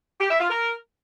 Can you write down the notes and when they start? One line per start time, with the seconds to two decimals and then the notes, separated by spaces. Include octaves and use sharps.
0.21 G4
0.31 E5
0.40 F4
0.50 A#4